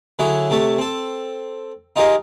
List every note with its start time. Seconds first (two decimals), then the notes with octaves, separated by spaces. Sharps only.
0.19 D3 F#3 E4 G#4 C#5
0.50 C3 A3 A4 C#5
0.78 C4 A4
1.96 D#4 F4 G4 G#4 A#4 D#5